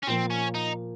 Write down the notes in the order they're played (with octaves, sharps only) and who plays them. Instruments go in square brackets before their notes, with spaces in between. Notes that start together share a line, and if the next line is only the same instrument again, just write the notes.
[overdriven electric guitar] C#4
[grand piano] A#2 F3 A#3 [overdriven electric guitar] C4
[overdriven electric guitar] C#4
D#4